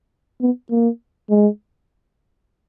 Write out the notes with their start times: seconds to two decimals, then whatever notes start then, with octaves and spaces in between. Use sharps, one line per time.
0.41 B3
0.71 A#3
1.30 G#3